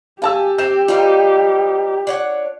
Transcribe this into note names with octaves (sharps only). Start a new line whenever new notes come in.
G4 F5 G#5 A5 E6
C4 G6 E7
G3 C4 D#4 F4
D4 C#5 F#5